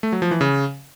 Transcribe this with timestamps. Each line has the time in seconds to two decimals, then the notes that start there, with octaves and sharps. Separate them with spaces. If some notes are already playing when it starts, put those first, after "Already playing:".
0.03 A3
0.12 F#3
0.22 F3
0.31 E3
0.41 C#3